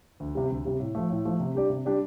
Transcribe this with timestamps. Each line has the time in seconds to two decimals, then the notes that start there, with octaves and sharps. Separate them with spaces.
0.20 D2
0.35 C3 G3
0.50 D2
0.65 C3 G3
0.80 A2
0.95 F3 A3
1.10 A2
1.25 F3 A3
1.40 C3
1.55 G3 D4 G4 D5
1.70 C3
1.85 G3 D4 G4 D5